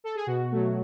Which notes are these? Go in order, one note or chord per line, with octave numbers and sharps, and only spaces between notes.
A4
G#4
B2 F#4
F#3 A3